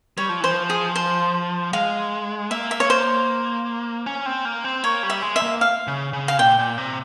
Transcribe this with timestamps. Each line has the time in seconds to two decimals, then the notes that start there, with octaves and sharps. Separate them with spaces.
0.18 G3 C#5
0.29 F3
0.41 E3 C5
0.51 F3
0.70 G#4
0.96 C5
1.73 G#3 F5
2.51 A#3 E5
2.71 E5
2.80 C#5
2.90 C5
4.06 C#4
4.26 C4
4.45 A#3
4.64 C4
4.83 A#3 C#5
5.03 G3
5.10 E5
5.22 G#3
5.36 E5
5.42 A#3
5.61 F5
5.87 C#3
6.13 C#3
6.28 F5
6.39 A#2 G5
6.59 A#2
6.78 C3